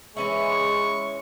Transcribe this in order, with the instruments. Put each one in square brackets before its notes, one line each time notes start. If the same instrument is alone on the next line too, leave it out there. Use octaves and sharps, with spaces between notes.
[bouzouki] E3 C#4 E4 [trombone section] G#3 [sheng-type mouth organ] C#6